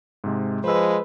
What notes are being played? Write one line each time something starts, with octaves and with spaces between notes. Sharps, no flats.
G#2 C3 G#3
F3 G#3 B4 C5 E6